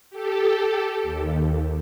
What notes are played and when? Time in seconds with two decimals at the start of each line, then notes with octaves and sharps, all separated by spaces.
0.10 G4 A4
1.03 D#2